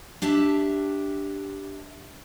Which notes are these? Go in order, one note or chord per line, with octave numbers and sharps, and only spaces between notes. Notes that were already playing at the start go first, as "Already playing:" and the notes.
D4 G4 E5 A5